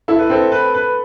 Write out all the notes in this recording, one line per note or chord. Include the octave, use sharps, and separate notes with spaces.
E4 A4
B4
C4 A4
B4
B4